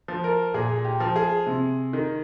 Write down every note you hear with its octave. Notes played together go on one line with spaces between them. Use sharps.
F3
A#4
A#2 G#4
G4
F3
G#4
C3
D#3